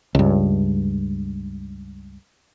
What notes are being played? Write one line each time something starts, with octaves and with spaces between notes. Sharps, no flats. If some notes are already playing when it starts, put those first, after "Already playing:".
C#2 G2